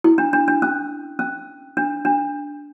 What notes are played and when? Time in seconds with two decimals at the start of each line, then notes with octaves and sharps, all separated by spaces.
0.04 E4
0.18 D4
0.33 D4
0.48 D4
0.62 C#4
1.19 C#4
1.77 D4
2.05 D4